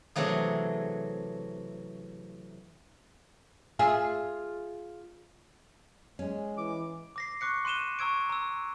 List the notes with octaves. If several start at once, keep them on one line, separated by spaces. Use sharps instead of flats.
C3 E3 F#3 A3 G#4
F4 G#4 E5
G#3 C#4
E3 D6
D6 A#6 C7
C#6 D6 F#6 C#7
C6 F#6 D#7 E7 G7
A#5 C#6 E6 G#6 D7
A#5 E6